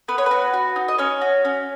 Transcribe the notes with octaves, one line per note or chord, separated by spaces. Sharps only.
B3 B4
C#5
F#4 B4
F#4
D#4
D#5
C#4 C#5
F#4
C#4